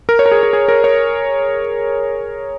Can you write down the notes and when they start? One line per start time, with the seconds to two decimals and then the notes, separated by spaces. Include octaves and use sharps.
0.09 A#4
0.19 C#5
0.26 A#4
0.32 G#4
0.43 G#4
0.53 G#4
0.68 A#4
0.84 C#5